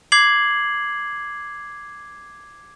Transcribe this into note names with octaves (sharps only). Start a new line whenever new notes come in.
D6 G#6 C7 F#7